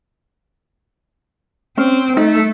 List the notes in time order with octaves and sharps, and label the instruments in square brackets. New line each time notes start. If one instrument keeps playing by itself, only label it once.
[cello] C4 [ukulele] C#4
[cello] A3 [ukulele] D#4